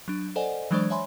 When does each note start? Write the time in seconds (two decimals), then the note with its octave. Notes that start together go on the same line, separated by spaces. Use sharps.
0.08 F#3 D4
0.36 A4 C5 D5 D#5 F#5 G#5
0.71 E3 F#3 G#3 D4 C5 D5
0.90 C#5 E5 G#5 B5 C6